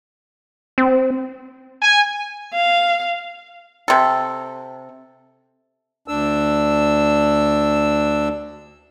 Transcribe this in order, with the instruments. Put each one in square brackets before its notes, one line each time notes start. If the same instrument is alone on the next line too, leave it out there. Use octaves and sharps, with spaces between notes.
[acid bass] C4
[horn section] G#5
[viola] F5
[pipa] C3 A4
[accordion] D2 D4 E6